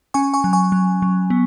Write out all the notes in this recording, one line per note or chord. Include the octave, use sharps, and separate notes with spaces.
C#4 G#5 C#6
G#5 C#6
F#3
G#5 C#6
F#3
F#3
B3